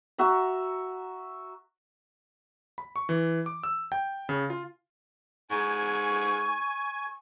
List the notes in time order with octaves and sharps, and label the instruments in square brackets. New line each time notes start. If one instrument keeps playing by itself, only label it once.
[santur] F#4 E5 A#5
[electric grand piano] B5
C#6
E3
D6
E6
G5
C#3
F4
[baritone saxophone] G#2 [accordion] G#5 [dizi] C#6